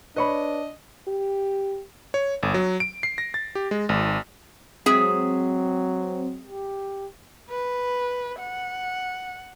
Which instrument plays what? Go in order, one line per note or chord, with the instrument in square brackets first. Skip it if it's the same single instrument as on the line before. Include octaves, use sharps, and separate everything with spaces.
[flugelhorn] D4 [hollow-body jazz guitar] B4 C#5 B5 [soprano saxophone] D#5
[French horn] G4
[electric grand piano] C#5
G1
F#3
D7
C7
A#6
A6
G4
G#3
G#1
[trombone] F#3 [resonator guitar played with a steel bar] G#3 G#4 E5 [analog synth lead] C4
[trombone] G4
[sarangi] B4
F#5